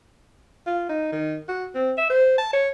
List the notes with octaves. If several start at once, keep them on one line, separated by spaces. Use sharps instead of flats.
F4
D#4
D#3
F#4
C4
E5
C5
A5
C#5